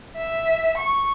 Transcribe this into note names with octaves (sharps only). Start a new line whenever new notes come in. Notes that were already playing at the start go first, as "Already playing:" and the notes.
E5
C#6